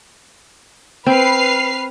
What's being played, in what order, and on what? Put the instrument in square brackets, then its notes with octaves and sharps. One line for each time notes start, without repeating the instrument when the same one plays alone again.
[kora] C4 [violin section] B4 F6 C7